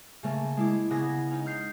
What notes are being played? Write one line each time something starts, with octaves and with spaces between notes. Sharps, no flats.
C#3 A3 A#3
G#3 E4 D6
C#3 B3 E4 G#4 G#6 A#6
C#4 D#4
F6 G6 C7